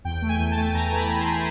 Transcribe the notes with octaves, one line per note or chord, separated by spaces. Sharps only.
E2 G5
A3
G#5
E2
A5
A3
A5
E2 A#5
E3
B5
A3
C6
A3